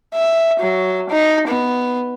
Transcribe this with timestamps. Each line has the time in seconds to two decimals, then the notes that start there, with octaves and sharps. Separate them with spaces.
0.15 E5
0.60 F#3
1.10 D#4
1.48 B3